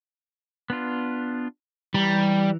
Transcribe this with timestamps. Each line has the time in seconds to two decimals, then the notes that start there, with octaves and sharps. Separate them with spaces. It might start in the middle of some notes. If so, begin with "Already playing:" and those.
0.70 B3 D4 F4
1.94 E3 G3 A#5